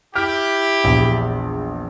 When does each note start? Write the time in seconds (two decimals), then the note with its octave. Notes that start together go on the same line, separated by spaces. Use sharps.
0.16 E4 G4 F6
0.84 A#1 E2